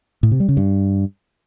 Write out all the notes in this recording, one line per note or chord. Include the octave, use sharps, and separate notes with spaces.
A2
C3
G3
C#3
G2